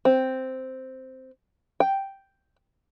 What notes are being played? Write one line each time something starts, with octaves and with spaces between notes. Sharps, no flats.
C4
G5